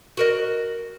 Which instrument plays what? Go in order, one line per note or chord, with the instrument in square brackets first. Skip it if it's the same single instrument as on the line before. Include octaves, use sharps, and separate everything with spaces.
[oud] F#4 A#4 D#5